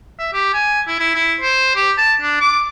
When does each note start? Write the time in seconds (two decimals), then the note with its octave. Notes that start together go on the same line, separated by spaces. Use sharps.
0.19 E5
0.33 G4
0.53 G#5
0.87 E4
0.99 E4
1.15 E4
1.41 C5
1.76 G4
1.98 A5
2.22 D4
2.40 D6